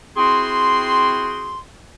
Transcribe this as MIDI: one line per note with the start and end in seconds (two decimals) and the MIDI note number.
0.17 1.58 60
0.17 1.58 64
0.17 1.58 66
0.17 1.58 68
0.17 1.58 79
0.17 1.58 84